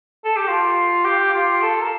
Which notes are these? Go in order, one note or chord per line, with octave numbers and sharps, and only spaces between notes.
A4
G4
F4
G4
F4
A4
A#4